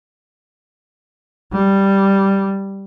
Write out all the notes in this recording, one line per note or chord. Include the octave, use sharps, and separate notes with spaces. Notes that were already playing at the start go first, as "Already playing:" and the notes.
G3